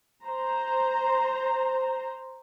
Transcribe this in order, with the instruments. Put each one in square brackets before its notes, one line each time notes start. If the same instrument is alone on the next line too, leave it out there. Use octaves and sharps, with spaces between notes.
[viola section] C5 A#5